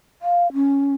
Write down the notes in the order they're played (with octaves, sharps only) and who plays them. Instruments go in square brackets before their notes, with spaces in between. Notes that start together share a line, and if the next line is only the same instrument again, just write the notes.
[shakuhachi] F5
C#4